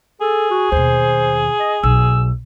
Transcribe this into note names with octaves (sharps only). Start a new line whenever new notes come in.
G#4 A4
F#4
D#2 B2 C5
D#5
B1 E6